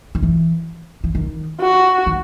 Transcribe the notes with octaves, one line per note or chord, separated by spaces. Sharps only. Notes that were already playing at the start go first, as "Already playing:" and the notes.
D#3
E3
E3
D#3
F#4
D#3